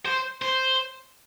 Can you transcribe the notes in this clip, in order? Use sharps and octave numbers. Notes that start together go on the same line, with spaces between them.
C5
C5